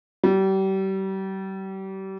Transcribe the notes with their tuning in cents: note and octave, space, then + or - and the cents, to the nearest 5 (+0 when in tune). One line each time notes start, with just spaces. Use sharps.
G3 -35